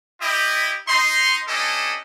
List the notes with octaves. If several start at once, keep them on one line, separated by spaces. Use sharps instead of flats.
E4 G4 D#5
D#4 C6
C#4 D4 E4 G4 A4 D#5